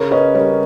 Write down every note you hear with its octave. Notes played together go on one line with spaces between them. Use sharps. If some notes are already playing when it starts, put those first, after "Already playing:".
Already playing: C#3 A#4 C#5
C#4 B4 D#5
G3 A#4 C#5